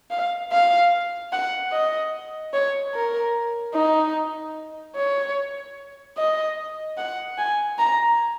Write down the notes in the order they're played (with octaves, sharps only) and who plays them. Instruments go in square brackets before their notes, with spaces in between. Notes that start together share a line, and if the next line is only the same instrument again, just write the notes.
[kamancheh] F5
F5
F#5
D#5
C#5
A#4
D#4
C#5
D#5
F#5
G#5
A#5